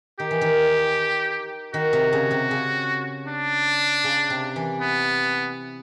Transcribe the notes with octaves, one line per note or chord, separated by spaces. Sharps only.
D#3 G4
E3
D#3
D#3 F#4
C3
C#3
C3
C#3
D4
C#3
C3
E3
B3